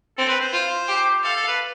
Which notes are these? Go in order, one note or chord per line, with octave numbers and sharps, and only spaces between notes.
C4 A4
B4
C5
F4
G4
A4 F5
A4
B4